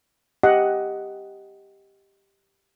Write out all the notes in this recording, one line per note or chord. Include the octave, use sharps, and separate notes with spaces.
G4 D#5 F#5